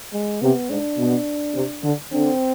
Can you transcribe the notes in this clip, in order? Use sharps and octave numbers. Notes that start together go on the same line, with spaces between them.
G#3
C3 B3
G#2 D4
B2
C3
D3
D3 C4